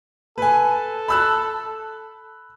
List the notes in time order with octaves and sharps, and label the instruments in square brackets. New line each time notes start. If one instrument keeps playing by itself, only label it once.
[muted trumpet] A4 [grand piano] B4 G#5
[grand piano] B5 E6 F#6